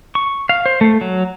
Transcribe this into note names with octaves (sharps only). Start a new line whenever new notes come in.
C#6
F5
C5
A3
F#3